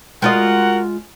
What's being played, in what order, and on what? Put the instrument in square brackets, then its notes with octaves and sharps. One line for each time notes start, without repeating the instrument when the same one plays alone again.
[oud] G#3 F4 D#5 [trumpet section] F#4 A#4 F#5